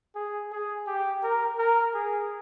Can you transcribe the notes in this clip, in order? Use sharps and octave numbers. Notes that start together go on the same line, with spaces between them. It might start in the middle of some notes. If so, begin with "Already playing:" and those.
G#4
G#4
G4
A#4
A#4
G#4